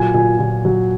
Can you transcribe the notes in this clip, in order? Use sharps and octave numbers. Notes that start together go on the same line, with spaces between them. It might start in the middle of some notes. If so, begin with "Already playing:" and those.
Already playing: A#2 F#3 G#5
A#2 G#5
A#2
F#3